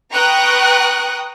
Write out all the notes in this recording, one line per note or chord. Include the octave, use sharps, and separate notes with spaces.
B4 G5 A#5 C#6 D#6 F#6